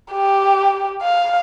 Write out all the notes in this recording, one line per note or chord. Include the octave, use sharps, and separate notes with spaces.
G4
F5